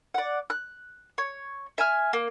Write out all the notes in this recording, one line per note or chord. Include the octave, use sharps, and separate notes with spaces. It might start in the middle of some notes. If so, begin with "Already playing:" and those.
D5 F#5
F#6
C#5
E5 G#5 F6
A#3